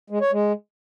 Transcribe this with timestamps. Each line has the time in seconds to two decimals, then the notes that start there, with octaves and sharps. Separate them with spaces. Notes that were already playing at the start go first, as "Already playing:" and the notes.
0.10 G#3
0.21 C#5
0.32 G#3